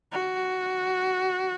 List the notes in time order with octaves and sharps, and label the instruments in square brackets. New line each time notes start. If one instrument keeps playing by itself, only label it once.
[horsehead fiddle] F#4